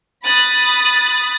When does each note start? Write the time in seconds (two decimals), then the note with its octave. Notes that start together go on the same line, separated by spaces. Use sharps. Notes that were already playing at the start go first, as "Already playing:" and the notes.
0.24 B5 D#6 F#6 A6